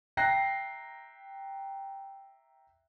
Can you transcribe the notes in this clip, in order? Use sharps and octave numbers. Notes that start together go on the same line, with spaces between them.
E5 G5 A#5 F#6 A#6 C7